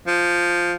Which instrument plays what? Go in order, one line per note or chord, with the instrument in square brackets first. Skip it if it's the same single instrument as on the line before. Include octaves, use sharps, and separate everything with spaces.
[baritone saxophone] F3